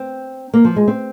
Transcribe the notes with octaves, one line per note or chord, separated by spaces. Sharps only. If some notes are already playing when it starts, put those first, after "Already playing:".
Already playing: C4
A#3
F3
G#3
C4